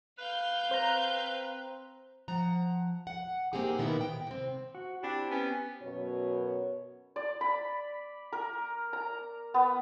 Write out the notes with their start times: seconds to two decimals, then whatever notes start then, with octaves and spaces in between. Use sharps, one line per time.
0.19 B4 F5 G6
0.71 C4 C5 A#5
2.28 F3 F#5 A#5
3.07 F#5
3.53 A#3 C4 D#4 G4 G#4
3.78 B2 D#3 A#3 B3 E4 B4
4.01 G5
4.27 C3 C4
4.75 F#4
5.03 C4 D4 E4 G4
5.31 B3 C#4
5.83 F#2 B2 F#3 C#5
7.16 D5
7.41 B5
8.32 A#4
8.93 A#5
9.54 B3